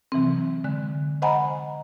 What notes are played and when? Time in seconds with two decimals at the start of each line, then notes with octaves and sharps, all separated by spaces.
0.12 C3 E3 F#3 C4
0.64 D3 G#3 F#6
1.22 C5 D#5 F#5 G#5 A#5 B5